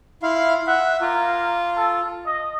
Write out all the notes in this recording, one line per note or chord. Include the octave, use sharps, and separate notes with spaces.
E4 F4 F5
E5 F#5
A#3 F4
A4
D#5